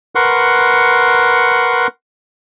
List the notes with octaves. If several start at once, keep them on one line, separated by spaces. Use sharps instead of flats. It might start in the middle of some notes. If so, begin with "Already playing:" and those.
A#4 B4 F#5 C6 C#6